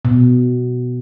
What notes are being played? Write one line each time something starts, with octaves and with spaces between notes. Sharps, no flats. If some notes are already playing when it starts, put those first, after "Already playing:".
B2